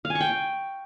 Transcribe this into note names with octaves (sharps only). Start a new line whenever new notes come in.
F5
G#5
C#6
G5